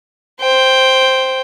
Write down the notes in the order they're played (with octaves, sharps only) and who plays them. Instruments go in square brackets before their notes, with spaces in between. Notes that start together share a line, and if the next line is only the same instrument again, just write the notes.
[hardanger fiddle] C5 G5